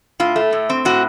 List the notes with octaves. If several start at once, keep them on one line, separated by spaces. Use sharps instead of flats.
A2 F4
A3
A2
C4
A2 F#4